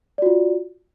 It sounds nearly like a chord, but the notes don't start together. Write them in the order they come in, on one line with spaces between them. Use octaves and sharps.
D5 F#4 F4